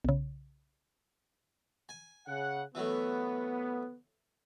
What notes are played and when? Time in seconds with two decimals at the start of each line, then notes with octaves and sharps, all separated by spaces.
0.05 B1 C#3
1.89 G#5
2.27 C#3 F#5
2.75 E3 F#3 A3 B3